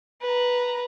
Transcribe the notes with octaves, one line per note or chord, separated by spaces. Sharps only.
B4 A#5